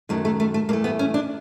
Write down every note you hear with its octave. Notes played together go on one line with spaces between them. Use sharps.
F#2 D#3 F#3 A3 A#3
A3
A3
A3
G2 E3 A3 A#3
B3
C#4
D4